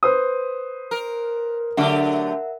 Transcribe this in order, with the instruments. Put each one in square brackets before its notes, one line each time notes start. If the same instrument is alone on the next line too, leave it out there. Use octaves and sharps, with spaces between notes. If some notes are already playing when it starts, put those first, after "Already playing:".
[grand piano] B4 C5 D#6
[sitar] A#4
[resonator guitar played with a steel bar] D3 F#3 D4 [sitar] A3 G4 [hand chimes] A#4 E5 F#5